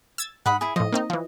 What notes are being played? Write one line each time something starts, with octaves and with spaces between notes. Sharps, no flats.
E6 G#6 A6
G#2 F#5 B5 D#6
E4 G#4
A2 F3 D#5
A#3 C4 D#4
E3 F3